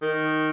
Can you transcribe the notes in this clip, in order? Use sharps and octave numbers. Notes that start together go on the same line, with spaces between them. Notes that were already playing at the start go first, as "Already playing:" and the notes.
D#3